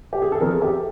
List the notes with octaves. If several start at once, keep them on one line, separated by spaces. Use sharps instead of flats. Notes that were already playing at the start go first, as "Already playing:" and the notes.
G4
G#4
A4
F2 G#4 A#4
G4 A4